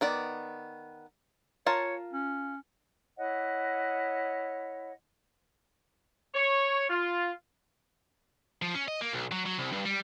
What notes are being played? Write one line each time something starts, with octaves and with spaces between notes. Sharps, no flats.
D#3 B3 D5
F4 A#4 C#5 A5
C#4
E4 C#5 D#5 F#5
C#5
F4
F3
C#4
D#5
A#3
B1
F#3
F#3
C2
G2
G3